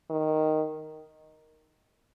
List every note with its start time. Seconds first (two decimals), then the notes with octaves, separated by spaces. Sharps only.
0.10 D#3